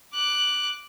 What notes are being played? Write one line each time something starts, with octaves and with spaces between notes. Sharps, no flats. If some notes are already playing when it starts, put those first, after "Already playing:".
D6 F#6